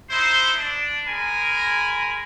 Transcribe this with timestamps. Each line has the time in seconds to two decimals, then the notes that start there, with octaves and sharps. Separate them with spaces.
0.10 D#4 E4 C5
0.57 D4
1.07 G#3 A#4 G#5 B5